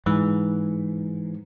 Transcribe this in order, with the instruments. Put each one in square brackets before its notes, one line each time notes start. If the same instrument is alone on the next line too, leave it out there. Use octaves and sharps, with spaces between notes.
[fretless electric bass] G#2 [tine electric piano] E3